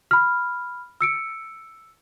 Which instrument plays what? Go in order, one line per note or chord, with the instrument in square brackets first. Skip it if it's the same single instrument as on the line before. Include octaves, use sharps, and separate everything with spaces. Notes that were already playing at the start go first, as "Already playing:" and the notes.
[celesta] B5 F6
E6 C#7 D7